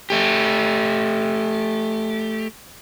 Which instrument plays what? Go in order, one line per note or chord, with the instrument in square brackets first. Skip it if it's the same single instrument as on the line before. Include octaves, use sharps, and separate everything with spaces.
[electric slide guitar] A3 G4